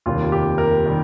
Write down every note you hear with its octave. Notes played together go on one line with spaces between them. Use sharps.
F1 D#2 D#3 G3 F4
G4
A#4
D#3 G3